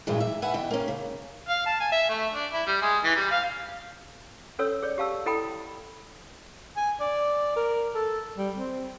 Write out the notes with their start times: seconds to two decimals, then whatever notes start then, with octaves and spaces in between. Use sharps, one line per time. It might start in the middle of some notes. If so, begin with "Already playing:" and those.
0.07 G2 A#2 E3 F#3 G#3
0.20 E5
0.42 B4 E5 F#5 G#5
0.54 E2 B2 G5
0.71 A#3 C#4
0.88 C#3
1.48 F5
1.66 A5
1.80 G#5
1.92 E5
2.09 A3
2.34 D4
2.54 E4
2.67 G3
2.82 G#3
3.04 E3
3.16 G3
3.31 F5
4.59 C#4 A4 C#5 E6
4.82 G#4 C#5 D5
4.98 G4 F5 A5 E6
5.26 E4 A4 D#5 G5 B5 D#6
6.77 G#5
7.00 D5
7.56 A#4
7.95 A4
8.38 G3
8.57 C4